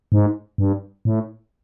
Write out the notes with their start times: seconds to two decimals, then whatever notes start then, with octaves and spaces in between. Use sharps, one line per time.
0.12 G#2
0.58 G2
1.05 A2